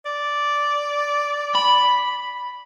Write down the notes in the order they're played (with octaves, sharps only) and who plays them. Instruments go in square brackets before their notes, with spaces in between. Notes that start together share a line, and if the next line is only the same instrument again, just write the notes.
[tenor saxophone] D5
[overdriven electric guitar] B5